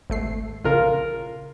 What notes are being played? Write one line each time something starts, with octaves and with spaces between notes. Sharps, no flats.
G#1 A3 C7
A#1 C#3 F4 A#4